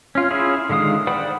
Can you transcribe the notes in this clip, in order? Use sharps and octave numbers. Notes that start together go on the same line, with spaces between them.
C#4 F4
C#4 E4 F4 G#4
D3 D#3 G#3 F5 D#6
C5 D5 F#5 G5 B5